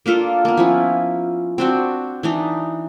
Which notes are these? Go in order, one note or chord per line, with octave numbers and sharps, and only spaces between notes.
A#3 D4 F4 A4
A#3 B3
F3 C#4 E4
C4 D4 F#4
E3 D4 D#4